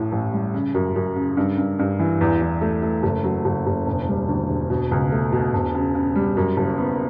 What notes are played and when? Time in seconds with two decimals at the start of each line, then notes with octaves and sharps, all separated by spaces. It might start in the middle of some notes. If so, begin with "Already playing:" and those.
Already playing: A1 A2
0.12 A1
0.33 G3
0.54 C#3
0.74 F#2
0.96 F#2
1.16 C#3
1.37 G2
1.58 G2
1.79 G2
1.99 E3
2.21 E2
2.42 E2
2.61 A3
2.82 A3
3.03 F#1
3.24 F#3
3.45 F#1
3.67 F#1
3.86 E1
4.08 G3
4.28 D2
4.50 E1
4.70 B2
4.91 C#2
5.12 A3
5.32 B2
5.54 E1
5.74 C#3
5.95 C#3
6.15 G3
6.37 F#2
6.57 F#1
6.78 B3